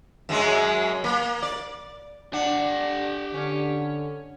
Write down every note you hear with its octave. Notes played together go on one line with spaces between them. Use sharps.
F#2 F#3 G#3
A#3
D5
D4 G4 F#5
D3 C#4